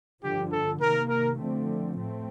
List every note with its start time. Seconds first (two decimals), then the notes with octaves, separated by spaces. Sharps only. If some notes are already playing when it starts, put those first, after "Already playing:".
0.24 G2 D3 F3 G4
0.52 A4
0.81 C3 D#3 A#3 A#4
1.09 A#4
1.38 D3 F3 A3 C4
1.96 A2 A3 C4